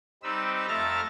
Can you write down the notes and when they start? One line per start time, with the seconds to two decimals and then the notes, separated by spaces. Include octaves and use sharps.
0.23 G3 C4 D#4 B4 E6
0.68 F2 A3 E5 A#5 F6 A6